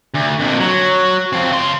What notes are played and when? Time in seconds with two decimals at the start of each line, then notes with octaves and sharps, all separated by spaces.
0.15 D2
0.40 F2 A#2
0.60 F#3
1.33 F3 C4
1.51 C#3 C6